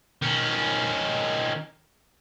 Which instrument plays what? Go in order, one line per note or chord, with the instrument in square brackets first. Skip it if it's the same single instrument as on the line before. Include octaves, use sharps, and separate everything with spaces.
[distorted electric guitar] D#3 C#4